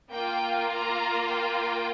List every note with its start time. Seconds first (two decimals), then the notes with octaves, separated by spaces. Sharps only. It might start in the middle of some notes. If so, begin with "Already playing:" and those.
0.12 A#3 F4 G5
0.70 A#5
1.29 G5